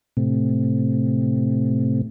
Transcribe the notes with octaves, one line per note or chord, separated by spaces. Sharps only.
A2 C3